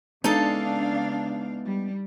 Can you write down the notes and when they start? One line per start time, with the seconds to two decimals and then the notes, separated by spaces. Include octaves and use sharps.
0.24 C#3 G#3 B3 D4 D#4 A4 F5
1.66 G3